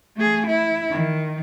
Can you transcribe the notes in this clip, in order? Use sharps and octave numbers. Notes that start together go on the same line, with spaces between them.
A3 G#4
E4
D#3